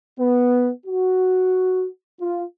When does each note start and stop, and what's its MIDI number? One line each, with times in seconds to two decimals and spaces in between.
0.18 0.69 59
0.85 1.86 66
2.19 2.41 65